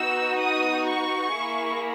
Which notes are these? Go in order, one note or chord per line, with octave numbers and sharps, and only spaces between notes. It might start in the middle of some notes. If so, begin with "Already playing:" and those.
Already playing: B3 D#4 F#4 E6
D#6
C#6
A#3 E4 G#4